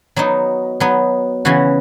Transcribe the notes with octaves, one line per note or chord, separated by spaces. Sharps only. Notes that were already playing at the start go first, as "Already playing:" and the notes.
F#3 B3 D#4
F#3 B3 D#4
C#3 E3 B3 F#4